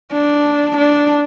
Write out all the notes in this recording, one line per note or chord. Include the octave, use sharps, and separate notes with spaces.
D4
D4